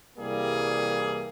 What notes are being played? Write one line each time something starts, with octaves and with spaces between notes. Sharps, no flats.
C2 E3 G3 A#3 G#4